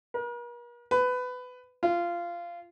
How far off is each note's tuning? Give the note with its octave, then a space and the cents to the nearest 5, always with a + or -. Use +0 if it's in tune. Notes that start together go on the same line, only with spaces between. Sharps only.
A#4 +45
B4 +20
F4 -15